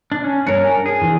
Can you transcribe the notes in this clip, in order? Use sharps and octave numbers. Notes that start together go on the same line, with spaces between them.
D4
C#4
G2 D4 A#4 C#5 C#7
G#5
G#4
E2